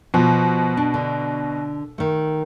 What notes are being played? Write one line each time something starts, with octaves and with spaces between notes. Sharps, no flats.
B2 F3
D4
D3
D#3 A3